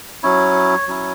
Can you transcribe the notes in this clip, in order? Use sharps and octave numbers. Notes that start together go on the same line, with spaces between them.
F#3 C#4 E4 C#5
F#3 C#4 E4